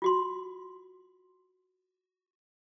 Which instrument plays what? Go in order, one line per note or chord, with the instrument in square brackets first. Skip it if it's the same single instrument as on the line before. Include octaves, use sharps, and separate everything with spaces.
[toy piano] F4 F#4 C6